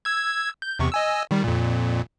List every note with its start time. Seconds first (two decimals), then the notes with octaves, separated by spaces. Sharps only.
0.05 E6 G#6
0.62 G6
0.79 E2 C3 C#6
0.92 D#5 G#5 E6
1.31 D#3 G3
1.44 F2 A#2